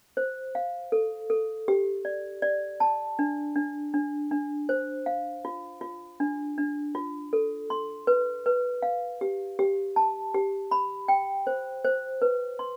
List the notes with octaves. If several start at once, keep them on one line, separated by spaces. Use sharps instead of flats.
C5
F5
A4
A4
G4
D5
D5
A5
D4
D4
D4
D4
C5
F5
F4
F4
D4
D4
F4
A4
C6
B4
B4
F5
G4
G4
A5
G4
B5
G5
C5
C5
B4
C6